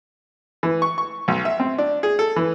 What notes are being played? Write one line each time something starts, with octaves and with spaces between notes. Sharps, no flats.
E3
C#6
C#6
B1
E5
C4
D4
G#4
A4
E3